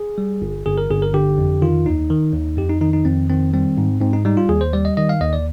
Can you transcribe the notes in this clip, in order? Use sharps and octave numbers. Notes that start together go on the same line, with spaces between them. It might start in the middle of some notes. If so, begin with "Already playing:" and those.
Already playing: G#4
G3
G1
G1 G#4
A#4
G1 G#4
A#4
D3 G4
F2
D#3 F4
D#2 D#4
D#3
D#2
F2 G4
D#4
D#3 D#4
D#4
F2 C4
D#3 C4
G3 C4
G#2
G#2 C4
D#4
G3 D#4
F4
D#2 G#4
C5
G3 D5
D#5
D#3 D#5
F5
D#2 D#5
D5